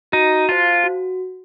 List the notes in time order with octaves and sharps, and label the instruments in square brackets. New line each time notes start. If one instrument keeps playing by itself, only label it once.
[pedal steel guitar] D#4 [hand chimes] F#4
[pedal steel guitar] F4 [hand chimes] C5 F5 A5
[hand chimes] F#4